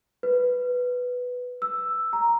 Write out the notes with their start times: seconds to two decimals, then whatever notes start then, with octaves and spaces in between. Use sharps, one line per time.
0.23 B4
1.62 E6
2.13 A#5